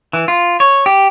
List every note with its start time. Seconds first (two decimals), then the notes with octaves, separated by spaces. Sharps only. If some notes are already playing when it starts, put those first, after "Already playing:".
0.13 E3
0.28 F4
0.60 C#5
0.86 G4